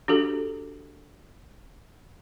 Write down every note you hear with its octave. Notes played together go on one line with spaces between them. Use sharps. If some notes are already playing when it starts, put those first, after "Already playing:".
D4 F#4 G4 A4